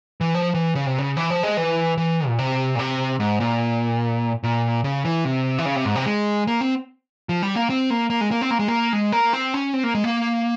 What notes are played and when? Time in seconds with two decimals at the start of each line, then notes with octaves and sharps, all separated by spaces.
0.21 E3
0.35 F3
0.54 E3
0.75 C#3
0.86 C3
0.98 C#3
1.17 E3
1.30 F3
1.43 G#3
1.57 E3
1.97 E3
2.27 A#2
2.39 C3
2.75 A#2
2.79 C3
3.20 G#2
3.40 A#2
4.43 A#2
4.84 C#3
5.05 E3
5.25 C3
5.58 E3
5.65 C#3
5.76 C3
5.85 G#2
5.96 C3
6.06 G#3
6.47 A#3
6.61 C4
7.29 F3
7.43 G3
7.55 A#3
7.70 C4
7.90 A#3
8.10 A#3
8.21 G#3
8.31 A#3
8.41 C4
8.50 A#3
8.59 G#3
8.68 A#3
8.93 G#3
9.12 A#3
9.33 C4
9.54 C#4
9.74 C4
9.84 A#3
9.95 G#3
10.04 A#3